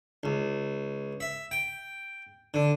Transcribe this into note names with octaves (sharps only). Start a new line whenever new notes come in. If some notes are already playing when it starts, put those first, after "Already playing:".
C#2
E5
G5
D3